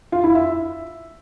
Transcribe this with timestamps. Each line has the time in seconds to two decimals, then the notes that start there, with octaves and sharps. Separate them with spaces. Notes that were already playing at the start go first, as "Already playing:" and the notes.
0.12 F4
0.24 E4
0.35 E5